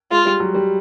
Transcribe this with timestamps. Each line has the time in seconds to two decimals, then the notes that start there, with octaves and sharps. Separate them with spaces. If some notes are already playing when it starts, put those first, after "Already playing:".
0.11 G#3 F4
0.25 G3
0.40 F#3
0.55 G3